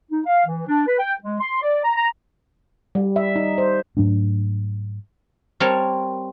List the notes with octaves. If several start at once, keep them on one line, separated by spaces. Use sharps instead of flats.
D#4
F5
E3
D4
B4
G5
G#3
C6
D5
A#5
A#5
G3
E5
D#4
C5
G#2 F#3 A3 D4
G3 C4 A#4 C#5 A5